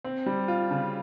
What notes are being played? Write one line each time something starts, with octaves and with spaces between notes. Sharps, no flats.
C4
G3
F4
C#3